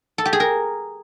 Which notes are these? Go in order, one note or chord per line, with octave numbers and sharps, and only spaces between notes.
A4
G4
G#4
A#4